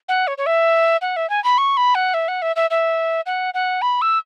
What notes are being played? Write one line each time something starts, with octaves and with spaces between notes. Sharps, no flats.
F#5
C#5
C#5
E5
F#5
E5
G#5
B5
C#6
B5
F#5
E5
F#5
E5
E5
E5
F#5
F#5
B5
E6